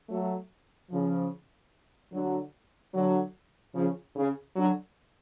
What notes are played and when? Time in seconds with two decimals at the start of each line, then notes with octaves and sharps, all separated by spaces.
0.09 F#3 A3
0.91 C#3 F3
2.12 D3 F#3
2.94 D3 F#3
3.75 C#3 F3
4.16 C#3
4.56 D3 F#3